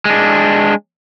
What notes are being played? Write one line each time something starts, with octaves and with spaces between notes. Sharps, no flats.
G#3 D4